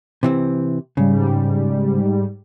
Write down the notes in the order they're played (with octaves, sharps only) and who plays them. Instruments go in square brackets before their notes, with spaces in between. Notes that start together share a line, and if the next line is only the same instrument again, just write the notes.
[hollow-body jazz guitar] C3 E3 C4
[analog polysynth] G#2 G3 [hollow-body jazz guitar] C#3